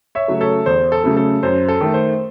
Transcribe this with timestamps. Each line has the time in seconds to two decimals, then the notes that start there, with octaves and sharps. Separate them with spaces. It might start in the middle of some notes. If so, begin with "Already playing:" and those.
0.15 C#5 E5
0.28 C#3 F#3 A3
0.41 A4 C#5
0.66 E2 C5
0.92 A4
1.04 C#3 F#3 A3
1.17 A4
1.43 F#2 C5
1.68 A4
1.81 D#3 A3
1.94 C5